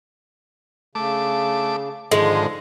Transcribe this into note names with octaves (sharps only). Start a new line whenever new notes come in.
C#3 A3 D6
G#2 D3 D#3 F3 G#3